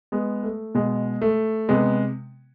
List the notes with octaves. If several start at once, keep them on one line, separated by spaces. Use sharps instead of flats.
G#3 B3
A3
B2 G#3
A3
C3 G#3 B3